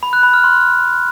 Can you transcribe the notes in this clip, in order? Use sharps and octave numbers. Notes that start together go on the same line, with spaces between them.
B5
F#6
B5
F6
C6